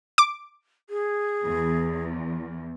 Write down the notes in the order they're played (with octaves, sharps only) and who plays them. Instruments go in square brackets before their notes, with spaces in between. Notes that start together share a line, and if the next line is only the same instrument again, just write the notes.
[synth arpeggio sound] D6
[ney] G#4
[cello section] E2